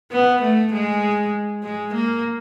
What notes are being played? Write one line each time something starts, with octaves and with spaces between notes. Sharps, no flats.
B3
A3
G#3
G#3
A#3